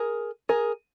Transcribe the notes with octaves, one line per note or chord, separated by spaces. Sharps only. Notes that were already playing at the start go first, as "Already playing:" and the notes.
Already playing: G#4 A#4
G#4 A#4